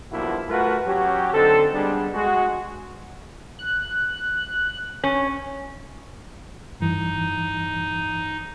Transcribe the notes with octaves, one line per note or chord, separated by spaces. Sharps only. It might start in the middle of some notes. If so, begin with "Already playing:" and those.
B1 G2 F3 A#3 E4 F#4
A3 F4 F#4 A#4 B4
F#3 C#4 F#4 G4
D3 C4 D#4 A4
G3 G#3 B3 D4
G#3 F#4
F#6
C#4
G2 E3 D#4